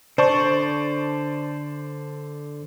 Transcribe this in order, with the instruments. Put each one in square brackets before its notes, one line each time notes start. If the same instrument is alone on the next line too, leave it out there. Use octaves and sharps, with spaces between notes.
[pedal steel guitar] D3 A5 C#6 [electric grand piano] C5 D5